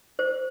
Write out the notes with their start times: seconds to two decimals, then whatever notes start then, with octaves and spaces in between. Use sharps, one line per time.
0.19 C5